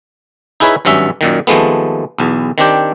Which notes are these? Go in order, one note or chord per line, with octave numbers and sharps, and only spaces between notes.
D#4 E4 G#4 B4 C#5 E5
G#1 G2 F#3 C#4 E5
F#2 A#2 D#3
D#2 F3 G#3 A3 B3
B1 E2
D#3 C4 D4 G4